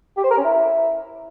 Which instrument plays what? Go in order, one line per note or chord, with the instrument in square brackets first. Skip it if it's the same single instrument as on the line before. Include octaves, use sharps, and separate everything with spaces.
[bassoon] G4
C5
A#4
C#4
E4